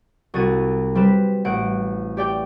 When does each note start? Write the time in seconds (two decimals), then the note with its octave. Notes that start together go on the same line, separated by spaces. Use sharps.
0.34 C2 F#4 A6 D#7
0.95 G3 C4 B4 E7
1.45 A1 F#5 D7
2.17 G4 D5 G5